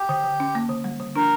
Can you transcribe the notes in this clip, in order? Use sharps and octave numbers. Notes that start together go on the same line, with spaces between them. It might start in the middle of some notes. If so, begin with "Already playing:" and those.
Already playing: G4
D3
D3
C#4
A#3
D3
G3
D3
D4 A#4